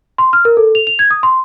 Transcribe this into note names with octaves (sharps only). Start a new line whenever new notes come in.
C6
F6
A#4
A4
F7
F7
G#6
D#6
C6